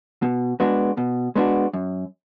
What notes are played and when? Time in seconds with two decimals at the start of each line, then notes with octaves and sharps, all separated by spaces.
0.22 B2
0.60 G#3 B3 D4 F#4
0.97 B2
1.36 G#3 B3 D4 F#4
1.73 F#2